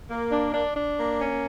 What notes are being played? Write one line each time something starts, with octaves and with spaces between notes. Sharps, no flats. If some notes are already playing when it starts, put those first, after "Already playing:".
A#3
D4
D4
D4
A#3
C#4